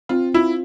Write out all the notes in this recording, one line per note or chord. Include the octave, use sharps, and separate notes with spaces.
C4 F4
E4 F4